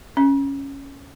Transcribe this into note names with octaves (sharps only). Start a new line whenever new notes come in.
C#4